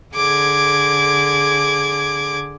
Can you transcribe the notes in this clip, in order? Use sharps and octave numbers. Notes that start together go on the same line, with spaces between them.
D3 G#4 D6 G#6